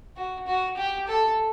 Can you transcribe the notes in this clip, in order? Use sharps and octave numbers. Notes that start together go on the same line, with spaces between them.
F#4
F#4
G4
A4